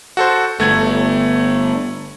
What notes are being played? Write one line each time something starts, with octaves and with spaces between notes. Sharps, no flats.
F#4 A4 C5
G1 A3 G#6